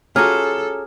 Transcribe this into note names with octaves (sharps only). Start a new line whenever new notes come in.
C#4 F4 F#4 G#4 A4 A#5 D6 F6